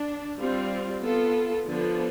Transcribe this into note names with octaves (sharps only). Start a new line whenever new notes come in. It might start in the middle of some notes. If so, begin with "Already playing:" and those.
Already playing: D4
G3 C4 F4
B3 F4 A4
D3 F3 B3